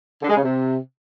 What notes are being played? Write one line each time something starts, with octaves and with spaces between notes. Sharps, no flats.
D3
G#3
C#3
C3